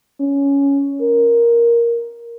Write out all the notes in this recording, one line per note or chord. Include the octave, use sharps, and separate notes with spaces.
C#4
A#4